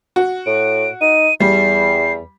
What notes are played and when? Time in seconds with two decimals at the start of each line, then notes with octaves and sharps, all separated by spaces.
0.16 F#4
0.46 A2 D7
1.01 D#4 D#7
1.40 E2 G3 C7